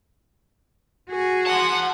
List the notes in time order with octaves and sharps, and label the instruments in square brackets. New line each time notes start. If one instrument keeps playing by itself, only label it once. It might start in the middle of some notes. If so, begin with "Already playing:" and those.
[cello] F#4 G#4
[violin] F#5 [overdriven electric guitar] A5 C6